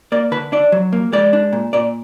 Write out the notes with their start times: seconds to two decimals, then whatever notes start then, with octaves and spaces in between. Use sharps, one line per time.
0.12 A#3 D5
0.31 D3 B4
0.52 D4 D5
0.72 F#3
0.93 A#3
1.12 G#3 D5
1.33 D4
1.53 A#2
1.73 A#2 D5